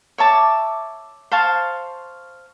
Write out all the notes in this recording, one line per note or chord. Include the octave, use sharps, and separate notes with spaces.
C#5 E5 A5 D6
C5 F5 A5 C#6